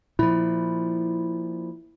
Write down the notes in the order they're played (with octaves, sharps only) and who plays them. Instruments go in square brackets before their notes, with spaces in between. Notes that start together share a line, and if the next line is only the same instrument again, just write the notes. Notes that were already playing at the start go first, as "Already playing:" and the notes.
[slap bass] A#2 F3 [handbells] E4